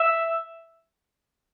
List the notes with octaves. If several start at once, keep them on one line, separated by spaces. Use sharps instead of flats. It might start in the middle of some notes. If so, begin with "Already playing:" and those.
Already playing: E5